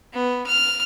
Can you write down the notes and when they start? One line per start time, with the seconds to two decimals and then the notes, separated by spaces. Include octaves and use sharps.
0.13 B3
0.47 F6